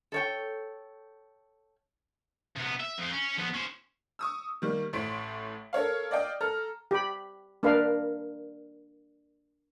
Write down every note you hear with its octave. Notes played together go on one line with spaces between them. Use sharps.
A4 C#5 G5
C3 B3
E5
F2 C4
C#4
F3 B3
C#4 C5
C#6 D#6 E6
D#3 G3 A#3
A1 A2 C6 B6 D7
A4 A#4 C#5 F5
D5 D#5 F5 G5
A4 A#5 F6
G4 B5
A#3 D4 A#4 B4 F5 B5